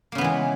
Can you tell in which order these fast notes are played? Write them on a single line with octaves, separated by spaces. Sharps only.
A#3 C#3 B3 E3 G#3